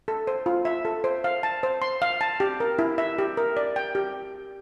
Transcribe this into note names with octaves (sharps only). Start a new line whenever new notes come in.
A4
C5
F4
E5
A4
C5
F5
A5
C5
C6
F5
A5
G4
A#4
E4
E5
G4
A#4
D5
G5
G4